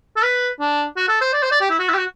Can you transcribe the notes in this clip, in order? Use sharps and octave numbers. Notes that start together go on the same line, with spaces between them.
A4
B4
D4
F#4
A4
C5
D5
C5
D5
G4
E4
F#4
E4
G4
F#4